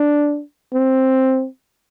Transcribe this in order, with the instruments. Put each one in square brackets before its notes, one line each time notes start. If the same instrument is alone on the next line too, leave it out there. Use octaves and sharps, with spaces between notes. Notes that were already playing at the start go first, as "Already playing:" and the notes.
Already playing: [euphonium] D4
C4